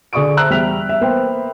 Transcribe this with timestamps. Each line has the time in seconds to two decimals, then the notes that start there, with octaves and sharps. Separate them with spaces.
0.13 D3 G#4 D5 C#6 D#6 D7
0.37 C5 E5 A5 A#5 E6 F#6
0.50 E2 G3 E5 F6 B6 F7
0.89 E5
1.01 A#3 B3 A#4 C5 E5 G5